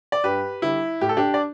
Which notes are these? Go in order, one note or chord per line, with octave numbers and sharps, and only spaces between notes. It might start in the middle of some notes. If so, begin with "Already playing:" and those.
D5
G2 G4 B4
D3 G3 E4
A2 G4
A4
D4 G4
D5